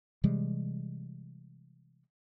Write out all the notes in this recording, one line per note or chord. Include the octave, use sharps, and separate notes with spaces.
C3 E3 G3 G#3